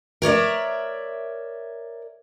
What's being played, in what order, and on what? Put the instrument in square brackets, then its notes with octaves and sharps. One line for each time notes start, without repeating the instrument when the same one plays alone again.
[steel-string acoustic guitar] A#4 C#5 D5 E5